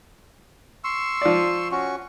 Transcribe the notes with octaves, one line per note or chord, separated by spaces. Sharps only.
C6 C#6 E6
F3 D5
C#4 F#4 C#6